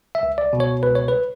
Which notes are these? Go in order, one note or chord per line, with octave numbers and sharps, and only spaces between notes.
E5
C#2
D5
B2
C#5
C#2 B4
C#5
B4